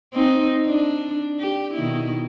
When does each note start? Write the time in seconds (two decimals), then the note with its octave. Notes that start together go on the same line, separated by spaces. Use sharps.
0.14 C4 D#4
0.67 D4
1.40 G4
1.74 B2 D#3 E4